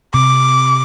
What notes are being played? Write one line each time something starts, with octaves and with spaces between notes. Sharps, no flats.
C3 D6